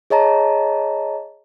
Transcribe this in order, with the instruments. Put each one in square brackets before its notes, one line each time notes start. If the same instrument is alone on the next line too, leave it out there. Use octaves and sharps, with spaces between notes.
[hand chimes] G#4 C#5 D#5 A5 A#5